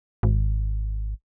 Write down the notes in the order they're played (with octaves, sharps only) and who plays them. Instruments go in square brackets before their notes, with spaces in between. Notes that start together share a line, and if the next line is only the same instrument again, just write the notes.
[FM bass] G#1